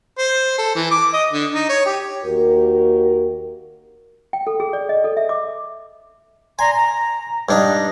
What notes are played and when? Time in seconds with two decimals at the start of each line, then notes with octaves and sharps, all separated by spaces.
0.18 C5
0.58 A4
0.76 E3
0.91 D6
1.14 D#5
1.33 D3
1.54 D#4
1.69 C#5
1.86 G4
2.24 D#2 F#4 G4 A#4
4.33 G5
4.47 A4
4.60 G#4
4.73 D5
4.89 D#5
5.04 A4
5.17 E5
5.29 D6
6.59 D5 G#5 A#5 C6
6.76 A#5
7.49 G2 D4 D#4